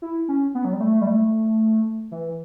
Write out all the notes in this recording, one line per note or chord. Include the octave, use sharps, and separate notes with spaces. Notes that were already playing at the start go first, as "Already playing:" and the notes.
E4
C#4
B3
F#3
G3
A3
G3
A3
E3